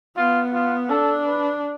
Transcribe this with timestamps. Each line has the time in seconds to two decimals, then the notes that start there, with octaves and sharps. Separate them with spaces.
0.17 B3 F4
0.53 F4
0.89 D4 A4
1.26 B4